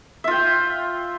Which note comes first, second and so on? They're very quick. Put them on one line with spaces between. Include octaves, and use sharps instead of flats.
E5 F4 G5